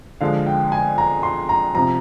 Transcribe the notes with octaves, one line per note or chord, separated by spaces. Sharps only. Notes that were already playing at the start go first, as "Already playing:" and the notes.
D3 F3 G#3 F5
G5
G#5
A#5
C6
A#5
C3 F3 A#5